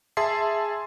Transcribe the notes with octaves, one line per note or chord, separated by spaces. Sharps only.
G#4 E5 A5 C6 C7